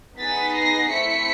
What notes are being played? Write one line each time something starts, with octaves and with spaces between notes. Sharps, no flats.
B3 D#4 G#4 A6 B6
A#6 C7
A3 C4 E4 B6 C#7